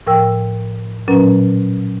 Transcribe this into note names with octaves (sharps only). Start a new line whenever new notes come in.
A2 F3 A#4 G5 E6
A#2 F#3 C#4 A#4 B4 A#5